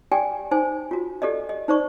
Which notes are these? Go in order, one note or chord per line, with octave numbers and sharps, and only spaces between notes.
G4 D5 G5 G#5
D#4 C5 G#5
F4 F#4
G4 A4 D5 D#5
D#5
D#4 C5 D5 C#6